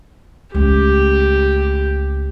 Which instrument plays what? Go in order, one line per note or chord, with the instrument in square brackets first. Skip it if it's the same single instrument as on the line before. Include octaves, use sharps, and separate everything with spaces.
[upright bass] C#2 A3 [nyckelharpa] G4